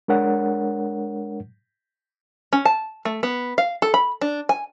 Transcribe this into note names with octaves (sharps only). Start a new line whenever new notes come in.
G#3 D4 A#4 C#5 F#5
C#4
A5
A3
B3
F5
A4
B5
D4
G#5